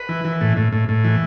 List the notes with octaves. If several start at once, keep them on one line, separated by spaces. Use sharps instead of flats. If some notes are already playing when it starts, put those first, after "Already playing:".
Already playing: B4
E3
E3
A2
A2
A2
A2
E3